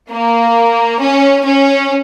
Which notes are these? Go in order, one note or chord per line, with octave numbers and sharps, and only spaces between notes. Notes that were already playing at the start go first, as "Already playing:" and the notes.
A#3
C#4
C#4